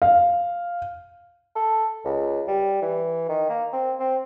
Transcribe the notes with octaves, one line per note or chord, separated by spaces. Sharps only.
F5
A4
C#2
G3
E3
D#3
A#3
C4
C4